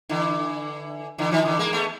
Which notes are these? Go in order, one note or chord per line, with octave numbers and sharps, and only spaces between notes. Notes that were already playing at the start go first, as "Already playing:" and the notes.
D3 E3
D3 E3
D#3 F3
D3 E3
G#3 A#3
A3 B3